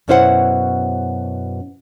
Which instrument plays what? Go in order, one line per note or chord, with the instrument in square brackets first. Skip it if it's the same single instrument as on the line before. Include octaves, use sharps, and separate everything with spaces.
[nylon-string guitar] F#2 B2 C#4 E4 C5 F#5